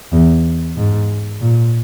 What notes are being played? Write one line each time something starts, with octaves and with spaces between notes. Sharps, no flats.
E2
G#2
A#2